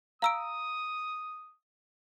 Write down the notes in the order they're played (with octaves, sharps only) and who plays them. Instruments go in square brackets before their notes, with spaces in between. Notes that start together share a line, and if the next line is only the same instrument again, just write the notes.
[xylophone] F5 E6 D7 [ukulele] A#5 [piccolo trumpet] D#6